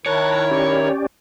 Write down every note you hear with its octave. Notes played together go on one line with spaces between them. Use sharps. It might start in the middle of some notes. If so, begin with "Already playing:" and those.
D#3 E4 A#4 C#5 A5 A#5 F#6
C#4 G4 D5